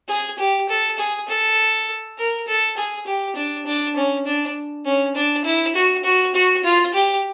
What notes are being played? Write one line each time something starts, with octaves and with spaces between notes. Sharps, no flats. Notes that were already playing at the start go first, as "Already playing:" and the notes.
G#4
G4
A4
G#4
A4
A#4
A4
G#4
G4
D4
D4
C#4
D4
C#4
D4
E4
F#4
F#4
F#4
F4
G4